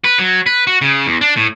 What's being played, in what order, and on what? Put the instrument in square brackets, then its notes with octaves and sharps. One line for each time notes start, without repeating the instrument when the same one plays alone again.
[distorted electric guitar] B4
F#3
B4
F#4
C#3
E2
D4
A2